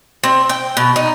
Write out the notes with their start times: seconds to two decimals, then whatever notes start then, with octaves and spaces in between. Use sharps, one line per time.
0.24 C4
0.49 G5
0.77 B2
0.96 D#4